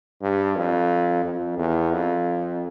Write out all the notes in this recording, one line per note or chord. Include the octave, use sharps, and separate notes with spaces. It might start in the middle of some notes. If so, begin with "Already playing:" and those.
G2
F2
F2
E2
F2